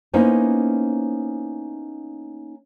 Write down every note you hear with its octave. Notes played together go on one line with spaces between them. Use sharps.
A#3 B3 C#4 D#4 E4 C5